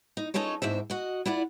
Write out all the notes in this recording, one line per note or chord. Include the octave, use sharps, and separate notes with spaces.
D#4
C#4 D#4 F4 A4 C#5
E2 G#2 C4 E5
F#4 D#5
E4 F4 D5 F#5